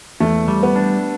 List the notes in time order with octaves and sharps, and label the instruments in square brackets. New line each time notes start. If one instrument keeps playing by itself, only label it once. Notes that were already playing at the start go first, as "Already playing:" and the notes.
[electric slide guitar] E2 [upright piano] A3
[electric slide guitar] G3
[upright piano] B3
[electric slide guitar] D4